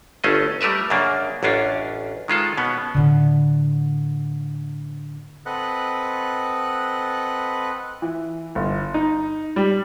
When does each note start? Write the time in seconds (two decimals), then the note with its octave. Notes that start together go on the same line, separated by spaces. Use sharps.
0.24 G1 A3 C#4 F4 D#5
0.61 G3 A3 A#4 B4 E5
0.90 F#2 C#3 A#3 D4
1.43 A1 F#2 C#4 D4 F4
2.28 D#3 G#3 F4 A4
2.58 B2 B3 C#4
2.94 A2 D3
5.46 C4 A4 B4 D#5 F#5 F#6
8.02 E3
8.55 G1
8.94 D#4
9.56 G3